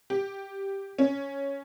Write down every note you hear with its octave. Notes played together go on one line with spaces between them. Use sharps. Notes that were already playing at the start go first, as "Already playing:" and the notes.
G4
C#4